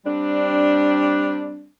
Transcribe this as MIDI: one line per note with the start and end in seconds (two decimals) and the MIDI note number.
0.05 1.68 55
0.05 1.68 60
0.05 1.68 62